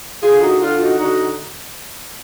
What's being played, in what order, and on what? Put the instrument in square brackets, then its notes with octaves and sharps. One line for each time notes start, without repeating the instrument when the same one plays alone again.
[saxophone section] D3 F4 G#4
D#4 F#4
D3 F4
D#4 F#4
D3 D#4 F#4